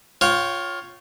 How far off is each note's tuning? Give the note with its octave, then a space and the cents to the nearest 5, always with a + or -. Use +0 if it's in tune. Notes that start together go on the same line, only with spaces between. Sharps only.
F4 +15 C#5 +0 G5 -25